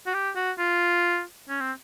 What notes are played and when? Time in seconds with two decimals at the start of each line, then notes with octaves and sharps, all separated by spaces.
0.06 F#4
0.14 G4
0.36 F#4
0.58 F4
1.49 C#4
1.61 C4